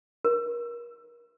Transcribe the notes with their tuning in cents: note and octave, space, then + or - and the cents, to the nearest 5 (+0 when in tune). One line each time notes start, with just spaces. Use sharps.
A#4 +35